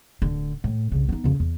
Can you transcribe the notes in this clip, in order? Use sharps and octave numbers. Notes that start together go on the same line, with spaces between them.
D1 D3
A2
C2 C#3
B3 D#4
F2 C#3
E2